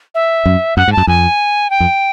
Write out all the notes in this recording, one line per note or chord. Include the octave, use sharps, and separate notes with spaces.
E5
F#2
F#2 F#5
G#2
A5
F#2
F2 G#5
G5
F2